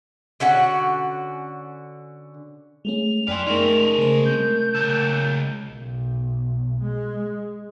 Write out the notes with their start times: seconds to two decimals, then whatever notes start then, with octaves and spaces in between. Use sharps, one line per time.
0.40 D3 C#4 F#4 F#5
2.85 G#3 A3 C#4 F7
3.27 F#2 B4 D5 E5 G5 G#5 C6 F6
3.47 G#3 A3 C#4 D#4 A#4 E5 C6
3.98 C#3 C5
4.25 C3 G6
4.75 C#2 A5 E6 F#6 A6
5.69 B1
6.81 G#3